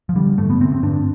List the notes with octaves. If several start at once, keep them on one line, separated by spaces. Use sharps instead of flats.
F3
D3 G3
G2 A3
B3
D3 C4
C4
G2 D4